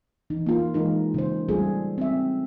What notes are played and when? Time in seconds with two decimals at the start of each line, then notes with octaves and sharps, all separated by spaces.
0.30 E3 D#4
0.46 A#3 F4
0.74 E3 G#3 D#4 A#4
1.14 C#3 C5
1.48 G3 A3 F4 G#4 A4
1.98 C4 E5